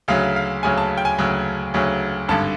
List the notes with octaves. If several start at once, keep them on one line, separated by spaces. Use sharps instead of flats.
D2 C#3 F#3 F5
F5
D2 C#3 F#3 G#5
A5
G5
G#5
D2 C#3 F#3
D2 C#3 F#3
G#1 G2 D3 A5